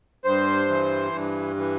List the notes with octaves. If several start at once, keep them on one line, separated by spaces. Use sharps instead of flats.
G2 C5
E3
G2
E3